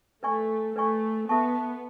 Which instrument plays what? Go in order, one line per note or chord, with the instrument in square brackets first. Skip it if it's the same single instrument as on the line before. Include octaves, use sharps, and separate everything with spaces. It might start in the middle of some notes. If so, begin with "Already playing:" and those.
[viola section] A3 [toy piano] B4 D5 G#5 C#6
[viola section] A3 [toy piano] B4 D5 G#5 C#6
[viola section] B3 [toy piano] A4 E5 A5 C#6